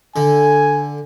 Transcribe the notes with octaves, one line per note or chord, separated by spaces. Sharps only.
D3 G#5